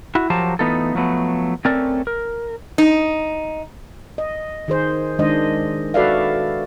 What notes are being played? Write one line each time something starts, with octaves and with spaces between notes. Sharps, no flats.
E4 F#4
F3 F#3 G4 A#4 C5 A5
E3 A3 B3 D#4 F4 A4
F3 F#3 A3 B3
A3 C4 C#4 A4 A#4 D5
A#4
D#4
D#5
D#3 G#4 C5
D#3 G#3 D4 C5 D#5
F#4 A4 B4 D5 E5 F5